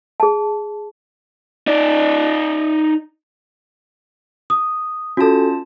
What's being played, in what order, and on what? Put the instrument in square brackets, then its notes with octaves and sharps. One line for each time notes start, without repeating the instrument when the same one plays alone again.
[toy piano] G#4 A5
[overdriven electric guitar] D#4 D5
[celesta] D#6
[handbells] C#4 F4 A5 [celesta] F#4 A4